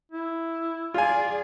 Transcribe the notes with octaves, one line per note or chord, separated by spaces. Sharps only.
E4
F4 G#4 D5 G#5